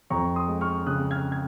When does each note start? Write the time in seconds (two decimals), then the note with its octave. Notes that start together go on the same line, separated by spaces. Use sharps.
0.10 F2 A#5 C#6
0.35 C6 D#6
0.48 G#3
0.61 C#6 F6
0.86 C#3 D#6 F#6
1.11 F6 G#6
1.32 G#6